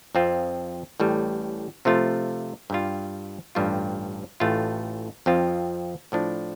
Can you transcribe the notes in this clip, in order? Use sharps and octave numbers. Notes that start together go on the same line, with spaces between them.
F2 F3 C4 F4
A1 A2 G3
C3 F3 A3 F4
G2 G3 F4
A1 G2 G3 F4
A1 A2 A3 F4
F2 F3 C4 F4
A2 F3 D4